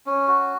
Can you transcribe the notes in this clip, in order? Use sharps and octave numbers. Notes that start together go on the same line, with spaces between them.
C#4
F#4